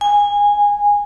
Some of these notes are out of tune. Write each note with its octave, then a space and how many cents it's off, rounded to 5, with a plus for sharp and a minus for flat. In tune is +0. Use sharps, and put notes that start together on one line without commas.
G#5 -15